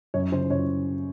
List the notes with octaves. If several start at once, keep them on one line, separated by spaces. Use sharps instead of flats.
F#2 C#5
C#3 C5
F#2 C#5